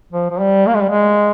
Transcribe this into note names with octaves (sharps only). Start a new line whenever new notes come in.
F3
F3
G3
A#3
G#3
G3
G#3